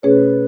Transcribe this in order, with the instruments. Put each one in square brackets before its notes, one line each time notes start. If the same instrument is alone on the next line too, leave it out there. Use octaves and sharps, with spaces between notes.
[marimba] B2 A3 C#4 G#4 C#5 [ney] B4